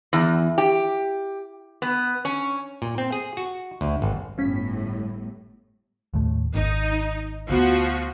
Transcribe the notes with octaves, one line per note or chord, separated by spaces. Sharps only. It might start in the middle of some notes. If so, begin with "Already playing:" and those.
E2
G4
B3
C#4
A#2
C4
G#4
F#4
D2
G#1
G1 A2 F3 C#4 B6
D#2 A2 A3
G#1 D#4
D2 F3 B3 F#4